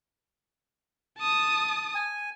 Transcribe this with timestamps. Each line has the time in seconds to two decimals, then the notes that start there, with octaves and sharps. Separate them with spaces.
1.18 A5 D#6
1.95 G#5